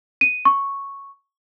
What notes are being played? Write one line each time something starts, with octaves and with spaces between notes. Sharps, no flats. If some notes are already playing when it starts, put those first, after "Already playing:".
D#7
C#6